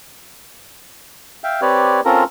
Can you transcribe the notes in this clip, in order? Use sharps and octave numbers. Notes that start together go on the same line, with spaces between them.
E5 F5 G5
C4 G4 B4 C#5 D5
C4 C#4 F4 A4 A#4 A#5